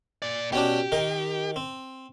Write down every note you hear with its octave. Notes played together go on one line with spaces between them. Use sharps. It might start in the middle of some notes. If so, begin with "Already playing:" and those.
A#2 D5
B2 C#4 D4 G4
D#3 D#4 A#4
C4